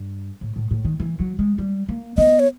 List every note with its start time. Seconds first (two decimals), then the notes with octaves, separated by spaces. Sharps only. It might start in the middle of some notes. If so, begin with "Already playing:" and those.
Already playing: G2
0.41 A2
0.56 A2
0.71 A2
0.85 D#3
1.00 E3
1.20 F#3
1.39 G#3
1.58 G3
1.89 A#3
2.18 B3 D#5
2.40 C#5